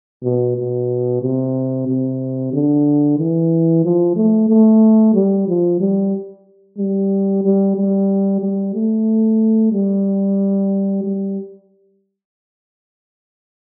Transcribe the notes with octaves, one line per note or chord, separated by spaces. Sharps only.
B2
B2
C3
C3
D3
E3
F3
A3
A3
G3
F3
G3
G3
G3
G3
G3
A3
G3
G3